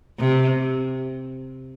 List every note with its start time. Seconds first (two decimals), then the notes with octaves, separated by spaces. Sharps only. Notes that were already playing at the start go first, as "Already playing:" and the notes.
0.19 C3